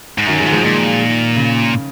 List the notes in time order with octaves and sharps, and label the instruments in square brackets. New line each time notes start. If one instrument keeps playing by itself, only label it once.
[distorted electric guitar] G#2
[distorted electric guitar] F#2 [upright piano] D#3 F#3
[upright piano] F3 G#3
[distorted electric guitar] G#2
[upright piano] F3 G#3
[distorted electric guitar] A#2 [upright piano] D#3
[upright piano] C#3